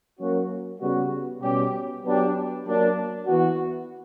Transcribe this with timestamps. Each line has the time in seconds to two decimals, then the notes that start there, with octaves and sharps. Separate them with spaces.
0.19 F#3 A#3 C#4 F#4
0.80 C#3 G3 B3 F#4
1.42 B2 G3 C#4 G4
2.03 F#3 B3 D4 G4
2.65 F#3 A#3 D4
3.26 E3 B3 F#4